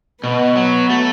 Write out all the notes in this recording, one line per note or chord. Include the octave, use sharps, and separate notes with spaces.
B2 B3
F#3
A3